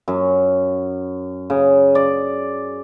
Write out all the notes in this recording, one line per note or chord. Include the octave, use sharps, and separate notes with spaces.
F#2
C#3
D5